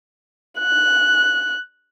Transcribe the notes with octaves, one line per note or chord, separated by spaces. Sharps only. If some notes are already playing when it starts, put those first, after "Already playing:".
F#6